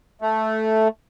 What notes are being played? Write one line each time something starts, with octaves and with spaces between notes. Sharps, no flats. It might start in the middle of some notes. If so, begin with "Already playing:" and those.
A3